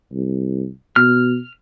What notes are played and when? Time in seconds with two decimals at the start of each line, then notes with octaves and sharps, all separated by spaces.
0.13 C2
0.96 B2 F6